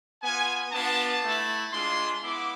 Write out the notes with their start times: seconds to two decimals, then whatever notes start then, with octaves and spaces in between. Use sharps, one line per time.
0.22 B3 F4 G#5
0.71 B3 D4 F4 A5
1.22 A3 E4
1.72 G#3 D4 F4 C6
2.21 B3 E4 D6